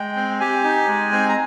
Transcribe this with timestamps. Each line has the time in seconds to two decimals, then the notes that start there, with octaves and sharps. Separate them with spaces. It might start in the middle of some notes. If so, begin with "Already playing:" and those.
Already playing: G#3 G5
0.16 C4
0.40 G4 G#5
0.64 D#4
0.88 G#3
1.12 C4
1.29 A#5